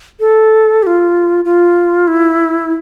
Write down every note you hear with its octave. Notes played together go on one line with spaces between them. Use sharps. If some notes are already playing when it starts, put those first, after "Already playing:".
A4
G4
F4
F4
E4